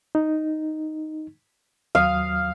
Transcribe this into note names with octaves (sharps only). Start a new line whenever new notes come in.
D#4
D#2 F#3 F5 D#6